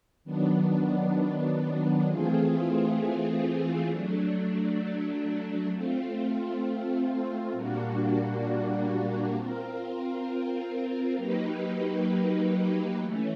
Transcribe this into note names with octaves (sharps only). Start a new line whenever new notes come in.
D#3 F#3 B3 D4
E3 A3 C4 F4 G#4
F#3 A3 D4
A3 C4 F4
A#2 G3 A#3 D4 F#4
C4 F4 A#4
F#3 A#3 D#4 G4 B4
E3 A3 C#4